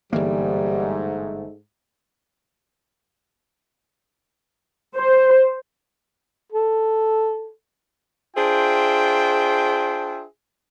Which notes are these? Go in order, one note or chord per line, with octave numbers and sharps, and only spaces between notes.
G1 G#2 E3 G3 A3 A#3
C5
A4
D4 F4 G#4 C5 E5 G5